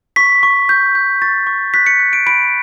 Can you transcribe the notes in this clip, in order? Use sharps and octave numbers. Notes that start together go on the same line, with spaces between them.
C#6 B6
C#6
G6
G6
C#6 A6
C#6
F#6 B6
C#7
F#6
D7
B5 D7